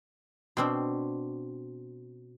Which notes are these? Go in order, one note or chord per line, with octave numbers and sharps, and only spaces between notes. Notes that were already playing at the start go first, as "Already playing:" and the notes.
B2 C4 D4